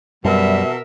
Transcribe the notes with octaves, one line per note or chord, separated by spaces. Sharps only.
F#2 B2 G3 A#4 E5